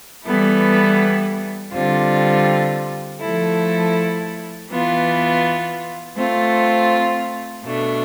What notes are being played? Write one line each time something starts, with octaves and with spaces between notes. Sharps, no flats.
E3 G3 B3 E4 A4
D3 G3 C4 F4
F3 A3 E4 A4
E3 B3 F4
A3 C4 F4
B2 A3 D4